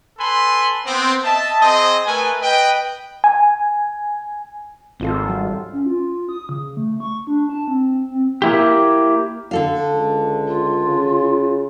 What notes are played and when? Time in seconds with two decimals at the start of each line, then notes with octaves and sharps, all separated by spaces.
0.19 A4 B4 G#5 B5 C6
0.85 B3 C4
1.25 D#5 E5 A5
1.61 C4 G#4 C5 D#5
2.06 A3 A#4 B4 G#5
2.41 B4 D#5 G5
3.24 G#5
5.00 G#1 C4 F4 A4
5.28 F#3 G3
5.73 C#4
5.86 F4
6.29 D#6
6.49 C#3
6.77 A3
7.00 C#6
7.27 D4
7.49 A5
7.68 C4
8.10 C4
8.42 A#3 E4 G4
9.51 D3 A4 F5
9.93 C#2
10.47 F4
10.88 C#3